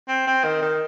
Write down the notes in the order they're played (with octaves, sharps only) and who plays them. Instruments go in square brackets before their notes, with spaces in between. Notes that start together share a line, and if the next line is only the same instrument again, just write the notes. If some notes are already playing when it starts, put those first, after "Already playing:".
[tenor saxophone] C4
C4
D#3
D#3